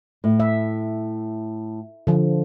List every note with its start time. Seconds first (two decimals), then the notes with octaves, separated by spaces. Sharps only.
0.24 A2
0.40 E5
2.07 D3 F3